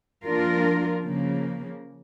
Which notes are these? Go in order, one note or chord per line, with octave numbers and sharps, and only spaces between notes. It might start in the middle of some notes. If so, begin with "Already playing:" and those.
F3 A#3 D4 F4 A#4
C#3 F3 A#3